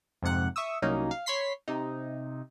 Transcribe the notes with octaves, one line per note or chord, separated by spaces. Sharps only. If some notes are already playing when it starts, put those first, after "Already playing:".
F2 G#2 C3 F#5 F#6
E5 C#6 D#6 E6
C2 F#3 A#3 C#4 D#4
F5
C#5 B5 C6 B6 C7
C3 D#4